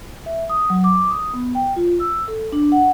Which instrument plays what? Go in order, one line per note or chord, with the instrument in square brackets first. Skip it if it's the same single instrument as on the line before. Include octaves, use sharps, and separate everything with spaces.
[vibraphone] E5
D#6
F#3
D6
D#6
B3
G5
F4
E6
A4
D4
F#5